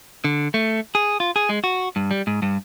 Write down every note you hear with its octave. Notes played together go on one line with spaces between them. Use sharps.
D3
A3
G#4
F4
G#4
G#3
F#4
G2
G3
G#2
G2